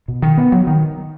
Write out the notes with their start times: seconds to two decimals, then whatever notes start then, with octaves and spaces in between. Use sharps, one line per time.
0.08 B2
0.22 D#3
0.37 B3
0.52 F#3
0.67 D#3